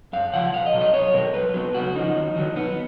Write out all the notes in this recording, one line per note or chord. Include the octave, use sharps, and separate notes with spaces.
F#2 F5
C#3 F3 F#5
B1 F5
D#5
B2 F#3
D#5
B1 C#5
B2 F#3 A#4
B1 B4
B2 F#3
C#2 F#4
C#3 F3 D#4
D#2
D#3 F#3
B1 B3